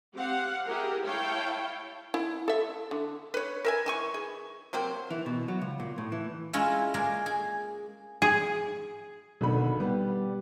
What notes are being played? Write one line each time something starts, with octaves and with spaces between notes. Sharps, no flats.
C4 G4 F5 F#5
E4 G4 G#4 A#4
E4 C#5 F5 G5 A5
E4
A4 E5
D3
B4 C#5
A#4 E5 G#5
E3 G#5 C#6
G#4
C3 F#3 A#3 C4
E3
B2
F#3
C#2
A#2
A2
E3
G#3 C#4 E4 F4 C#5 A5
G#3 A#3 G#4 A#4 D5 F5
G#4
G#4
G#1 B2 D3 B5
G3 B3